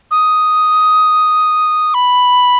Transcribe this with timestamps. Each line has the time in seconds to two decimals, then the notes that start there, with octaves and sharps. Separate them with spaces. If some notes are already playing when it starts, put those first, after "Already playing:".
0.11 D#6
1.94 B5